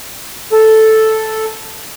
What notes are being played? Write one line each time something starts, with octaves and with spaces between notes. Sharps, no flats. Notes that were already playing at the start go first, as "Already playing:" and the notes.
A4